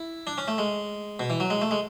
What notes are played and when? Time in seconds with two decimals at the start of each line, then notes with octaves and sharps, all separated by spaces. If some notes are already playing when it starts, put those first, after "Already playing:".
Already playing: E4
0.27 D4
0.38 C#4
0.48 A3
0.58 G#3
1.19 B2
1.30 E3
1.40 F#3
1.50 G#3
1.62 A3
1.71 G#3